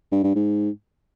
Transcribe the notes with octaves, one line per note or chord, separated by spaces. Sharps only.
G2
G2
G#2